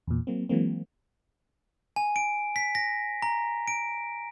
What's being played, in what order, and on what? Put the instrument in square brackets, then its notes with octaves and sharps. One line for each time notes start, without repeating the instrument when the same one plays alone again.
[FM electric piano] E2 A#2
F#3 A#3 C4
E3 F#3 G#3 A#3 C4
[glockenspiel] G#5
D7
B6
A#6
A#5
D7